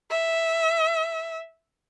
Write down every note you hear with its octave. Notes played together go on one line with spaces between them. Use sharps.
E5